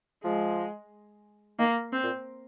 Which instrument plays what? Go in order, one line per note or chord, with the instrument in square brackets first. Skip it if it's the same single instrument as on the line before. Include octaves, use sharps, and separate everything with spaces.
[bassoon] F3 [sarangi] G#3
[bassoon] D#3 [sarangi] A#3
[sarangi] C4
[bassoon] A#2